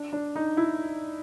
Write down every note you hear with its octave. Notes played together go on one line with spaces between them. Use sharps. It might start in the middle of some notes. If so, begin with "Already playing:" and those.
Already playing: D4
D4
D#4
E4